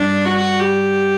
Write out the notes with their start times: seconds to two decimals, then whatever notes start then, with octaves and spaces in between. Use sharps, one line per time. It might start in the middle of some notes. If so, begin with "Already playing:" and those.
Already playing: G2 G3 D4
0.26 F#4
0.60 G4